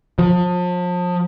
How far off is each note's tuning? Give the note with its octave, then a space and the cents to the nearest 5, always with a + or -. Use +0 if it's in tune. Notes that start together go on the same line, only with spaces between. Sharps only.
F3 +35